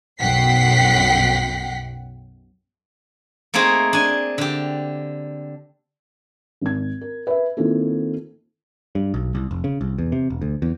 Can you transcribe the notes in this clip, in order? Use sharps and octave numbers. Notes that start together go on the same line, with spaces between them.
B1 F#2 F#5 G5 B6 C7
A3 A#3 C4 D#4 G#4 C5
D4 G#5
D3 G4
G#1 G#6
A#4
B4 E5
D#3 A#3 C4 E4 F4 A4
G2
B1
C2
F1
C#3
C2
E2
C3
E1
D2
E2